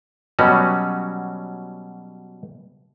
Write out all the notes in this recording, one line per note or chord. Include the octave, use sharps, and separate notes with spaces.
B2 F#3 G3 C#4 F#4